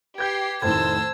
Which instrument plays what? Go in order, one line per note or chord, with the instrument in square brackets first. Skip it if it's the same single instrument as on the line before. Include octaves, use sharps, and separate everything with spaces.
[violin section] G4 C7 [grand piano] B4 G6 [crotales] G#6
[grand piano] F1 A2 D#3 [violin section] C5 [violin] A5 E6 [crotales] G#6